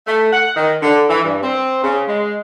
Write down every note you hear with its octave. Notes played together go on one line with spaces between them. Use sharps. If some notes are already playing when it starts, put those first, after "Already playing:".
A3
F#5
D#3
D3
E3
G2
C4
C#3
G#3